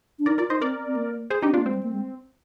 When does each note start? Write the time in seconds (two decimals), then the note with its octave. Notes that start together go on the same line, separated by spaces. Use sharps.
0.19 D4
0.26 D#4 A#4 D5
0.38 F4 A#4 D5
0.50 D#4 C5 D#5
0.61 C4 A#4 D5
0.86 C4
0.96 A#3
1.30 G#4 C5
1.42 D4 D#4 G4
1.50 C4
1.54 D4 F4
1.58 A#3
1.65 G#3 C4
1.74 G3
1.83 A#3
1.92 G#3